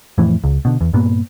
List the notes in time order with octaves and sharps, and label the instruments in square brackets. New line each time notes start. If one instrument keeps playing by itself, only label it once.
[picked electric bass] F2 A2 E3
C#2
B2 D3
E2
G2 A#2 A#3 B3